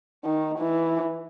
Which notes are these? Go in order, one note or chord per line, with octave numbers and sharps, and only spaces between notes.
D#3
E3